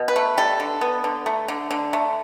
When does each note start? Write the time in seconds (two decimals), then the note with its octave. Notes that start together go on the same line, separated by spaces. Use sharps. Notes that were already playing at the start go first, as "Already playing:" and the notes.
Already playing: B2
0.08 B4
0.16 A3
0.37 G3 A4
0.60 D3
0.81 B3
1.04 D3
1.26 A3
1.48 D3
1.71 D3
1.93 A3